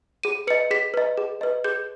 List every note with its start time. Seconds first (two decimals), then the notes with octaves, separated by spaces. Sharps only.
0.23 G#4 D#7
0.47 B4 D#5 C#7
0.71 G#4 B6
0.94 B4 D#5
1.17 G#4
1.41 B4 D#5
1.64 G#4 G6